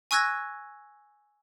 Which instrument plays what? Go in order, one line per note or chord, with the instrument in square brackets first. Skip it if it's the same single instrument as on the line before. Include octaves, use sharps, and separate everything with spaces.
[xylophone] G#5 C#6 E6 F#6 G#6 A#6